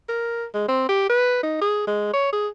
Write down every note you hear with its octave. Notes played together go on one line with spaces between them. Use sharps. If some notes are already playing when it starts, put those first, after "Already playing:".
A#4
G#3
C4
G4
B4
D#4
G#4
G#3
C#5
G#4